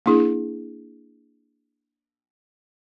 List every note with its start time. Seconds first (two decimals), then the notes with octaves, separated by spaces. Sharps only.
0.06 A#3 D4 E4 G#4